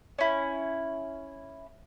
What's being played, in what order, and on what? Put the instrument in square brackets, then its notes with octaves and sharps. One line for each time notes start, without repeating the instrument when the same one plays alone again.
[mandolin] C#4 E4